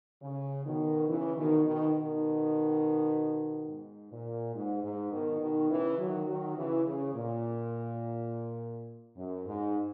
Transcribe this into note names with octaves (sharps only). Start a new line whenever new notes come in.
C#3
B2 D#3
C#3 E3
B2 D#3
B2 D#3
B2 D#3
G#2
A#2
G#2
G#2
B2 D#3
B2 D#3
C#3 E3
D#3 F#3
D#3 F#3
C#3 E3
C#3
A#2
F#2
G#2